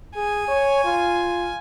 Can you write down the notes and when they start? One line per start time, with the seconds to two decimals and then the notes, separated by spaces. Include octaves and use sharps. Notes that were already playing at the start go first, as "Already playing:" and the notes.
0.16 G#4 G#5
0.48 C#5
0.85 F4